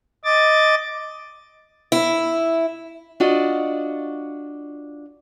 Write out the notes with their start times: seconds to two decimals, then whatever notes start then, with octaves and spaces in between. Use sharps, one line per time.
0.24 D#5 D6 A6
1.92 E4
3.20 D4 F4 F#4 D5 D#5